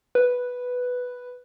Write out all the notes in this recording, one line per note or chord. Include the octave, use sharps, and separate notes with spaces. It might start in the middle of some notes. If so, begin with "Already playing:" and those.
B4